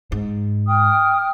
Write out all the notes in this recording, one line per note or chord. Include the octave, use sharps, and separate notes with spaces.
G#2
G5 D#6 F6